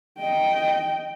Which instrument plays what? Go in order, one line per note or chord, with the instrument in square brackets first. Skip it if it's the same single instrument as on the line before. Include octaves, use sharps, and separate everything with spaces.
[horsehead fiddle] D#5 G5